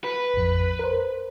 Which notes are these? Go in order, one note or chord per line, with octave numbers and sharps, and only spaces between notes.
B4
A1 F2
A#4 C5